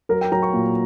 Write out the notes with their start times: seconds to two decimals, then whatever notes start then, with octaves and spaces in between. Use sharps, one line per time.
0.09 F#3 A#4
0.21 G5
0.32 F#3 A#5
0.43 C#6
0.54 A#2